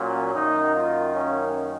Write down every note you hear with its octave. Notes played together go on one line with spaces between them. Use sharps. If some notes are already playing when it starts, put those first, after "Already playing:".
Already playing: A#2 F#3 C#4
F#2 D#3 A#3 D#4
F4
C#4